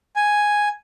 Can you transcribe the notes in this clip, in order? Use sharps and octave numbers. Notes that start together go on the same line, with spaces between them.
G#5